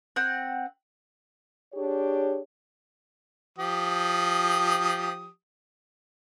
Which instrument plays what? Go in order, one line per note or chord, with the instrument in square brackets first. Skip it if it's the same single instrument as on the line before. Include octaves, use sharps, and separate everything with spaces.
[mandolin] C4 F#5
[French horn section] D4 G4 G#4 C#5
[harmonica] F3 G4 D#6